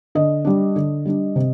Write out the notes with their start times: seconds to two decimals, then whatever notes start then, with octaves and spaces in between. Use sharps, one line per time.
0.15 D3 D#5
0.45 G3 D4
0.76 D3
1.05 G3 D4
1.36 C3